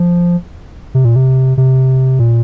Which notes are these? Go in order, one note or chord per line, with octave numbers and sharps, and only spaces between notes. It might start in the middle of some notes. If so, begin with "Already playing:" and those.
Already playing: F3
C3
A#2
C3
C3
A#2